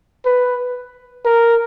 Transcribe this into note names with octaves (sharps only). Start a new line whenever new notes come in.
B4
A#4